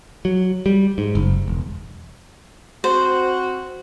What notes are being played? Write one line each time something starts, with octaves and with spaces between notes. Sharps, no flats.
F#3
G3
G#2
F#1
E1
C4 F#4 C5